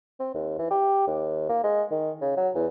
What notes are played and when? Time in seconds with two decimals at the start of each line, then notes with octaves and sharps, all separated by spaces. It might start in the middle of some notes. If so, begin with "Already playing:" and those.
0.20 C4
0.34 D#2
0.59 E3
0.70 G4
1.07 D#2
1.49 A#3
1.63 G#3
1.91 D#3
2.21 C#3
2.37 F#3
2.55 E2